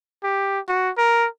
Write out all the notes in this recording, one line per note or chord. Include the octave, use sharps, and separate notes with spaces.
G4
F#4
A#4